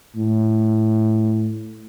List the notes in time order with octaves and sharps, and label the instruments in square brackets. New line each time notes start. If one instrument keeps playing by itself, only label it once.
[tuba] A2